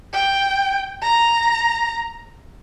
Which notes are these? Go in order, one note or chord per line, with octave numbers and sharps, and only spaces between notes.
G5
A#5